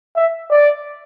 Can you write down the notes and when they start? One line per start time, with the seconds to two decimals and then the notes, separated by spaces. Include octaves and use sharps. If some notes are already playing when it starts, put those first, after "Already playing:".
0.16 E5
0.51 D5